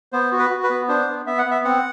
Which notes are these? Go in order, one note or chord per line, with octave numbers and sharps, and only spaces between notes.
B3 C5
F#4
B4
F#4
B4
B3
D4 C5
B3
B3 E5
F#5
B3
E5
C4 F#5